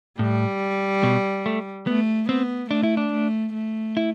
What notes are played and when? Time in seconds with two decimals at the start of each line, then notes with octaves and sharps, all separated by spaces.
0.19 A2 G3
1.03 B2
1.46 A3
1.87 A3 B3
2.29 B3 C4
2.71 A3 D4
2.83 E4
2.97 D4
3.13 A3
3.54 A3
3.97 E4